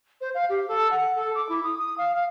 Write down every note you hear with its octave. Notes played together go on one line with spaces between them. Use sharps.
C5
F5
G4
A4
F#5
A4
D6
E4
D#6
D#6
F5
F5